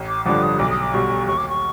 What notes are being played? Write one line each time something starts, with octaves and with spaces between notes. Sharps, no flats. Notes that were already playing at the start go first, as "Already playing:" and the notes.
Already playing: A1
D6
G2 D3 F3 D6
D#6
B1 D6
D#6
D6
B2 G3 C#6
D#2 C#6
D6
C#6